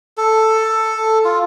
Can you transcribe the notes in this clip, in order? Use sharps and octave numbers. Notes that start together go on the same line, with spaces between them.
A4
F4